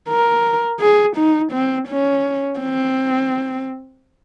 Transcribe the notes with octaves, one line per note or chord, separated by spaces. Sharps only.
A#4
G#4
D#4
C4
C#4
C4